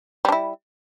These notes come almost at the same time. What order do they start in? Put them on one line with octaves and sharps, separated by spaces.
G3 D4 E4